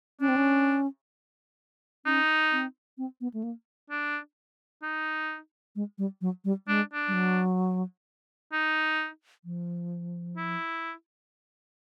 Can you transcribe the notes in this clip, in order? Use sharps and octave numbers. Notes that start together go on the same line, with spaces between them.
C#4 D4
C4
C#4
C#4 D#4
C4
C4
B3
A3
A#3
D4
D#4
G#3
G3
F#3
G3
G#3 D4
D4
G3
F#3
D#4
F3
E4